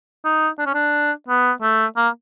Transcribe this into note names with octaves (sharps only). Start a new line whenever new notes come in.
D#4
D4
C#4
D4
B3
A3
A#3